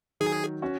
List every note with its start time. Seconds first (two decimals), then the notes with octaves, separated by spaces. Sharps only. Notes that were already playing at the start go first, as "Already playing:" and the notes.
0.20 D#3 F#3 D#4 G#4
0.62 C#4 F#4